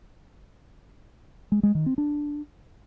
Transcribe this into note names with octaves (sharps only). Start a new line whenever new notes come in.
G#3
G#3
D#3
C4
D4